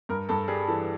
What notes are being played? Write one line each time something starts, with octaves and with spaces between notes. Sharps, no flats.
G2 A#4
G2 A4
G3 G#4
E3 A4